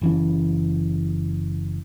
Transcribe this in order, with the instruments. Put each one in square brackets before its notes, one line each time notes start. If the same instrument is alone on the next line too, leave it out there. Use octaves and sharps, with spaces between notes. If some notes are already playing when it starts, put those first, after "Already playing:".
[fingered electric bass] F#1 E3 C#4